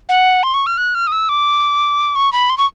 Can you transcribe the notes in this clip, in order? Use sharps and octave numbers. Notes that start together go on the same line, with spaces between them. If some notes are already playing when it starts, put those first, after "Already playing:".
F#5
C6
C#6
F6
F#6
F6
D#6
E6
D6
C#6
B5
C6
C#6